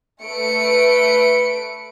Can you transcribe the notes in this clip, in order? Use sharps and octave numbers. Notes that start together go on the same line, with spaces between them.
A3 B4 C#7 D7